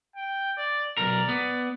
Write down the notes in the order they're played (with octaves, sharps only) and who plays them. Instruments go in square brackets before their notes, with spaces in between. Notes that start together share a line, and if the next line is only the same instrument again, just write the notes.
[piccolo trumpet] G5
D5
[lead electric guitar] B1 A#4 [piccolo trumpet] D5
[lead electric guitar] B3